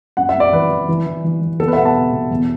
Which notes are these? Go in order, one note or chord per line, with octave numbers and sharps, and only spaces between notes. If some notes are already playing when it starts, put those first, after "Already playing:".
F#2 F#5
E5
F#2 D5
E3 B4
E3
E3
E3
E3
E3
E2 A4
B4
E5
B2 F#5
A5
B2
B2
E2